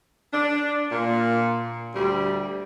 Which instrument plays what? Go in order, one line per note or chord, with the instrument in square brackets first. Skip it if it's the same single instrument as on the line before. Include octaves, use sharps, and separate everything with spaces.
[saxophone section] D4
A#2
D2 G3